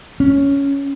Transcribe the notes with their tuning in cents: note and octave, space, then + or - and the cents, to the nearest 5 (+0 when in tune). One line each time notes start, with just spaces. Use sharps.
C#4 +10